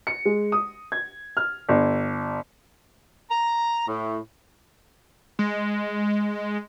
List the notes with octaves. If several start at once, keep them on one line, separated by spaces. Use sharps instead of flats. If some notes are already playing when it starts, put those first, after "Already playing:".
C#7
G#3
D#6
G#6
F6
G1
A#5
A2
G#3